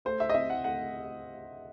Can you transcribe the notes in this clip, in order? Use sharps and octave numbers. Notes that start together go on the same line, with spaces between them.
A3 C5
E5
D#5
C4 E5
F#5
A3 F#5